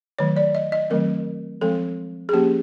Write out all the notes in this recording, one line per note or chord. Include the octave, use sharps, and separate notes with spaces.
D#3 F#3 A3 C#5
D5
D#5
D#5
D#3 F#3 A3 C4 A#4
F3 G#3 C4 A4
G#4
F3 A#3 C#4 G4